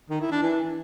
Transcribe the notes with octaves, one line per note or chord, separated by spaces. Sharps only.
D#3
E4
D4
E3